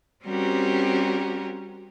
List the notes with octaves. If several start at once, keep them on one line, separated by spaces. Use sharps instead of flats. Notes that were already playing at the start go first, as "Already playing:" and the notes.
G3 C4 C#4 F#4 G4 A#4